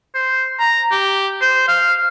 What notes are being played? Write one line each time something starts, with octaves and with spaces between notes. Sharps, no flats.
C5
A#5
G4
C5
F5